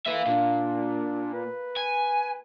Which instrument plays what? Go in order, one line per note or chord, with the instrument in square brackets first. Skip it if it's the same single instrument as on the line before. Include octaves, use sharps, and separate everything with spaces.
[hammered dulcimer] A#3 F4 [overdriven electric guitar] B4 E5
[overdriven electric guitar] A#2 [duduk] D4
[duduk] B4
[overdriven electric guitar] G#5